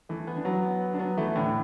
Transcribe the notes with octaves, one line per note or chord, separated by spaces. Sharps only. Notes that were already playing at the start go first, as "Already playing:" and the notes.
E3 A3
B3
D4
F#3 B3
D4
F#3 B3
E3 A3
A2 D3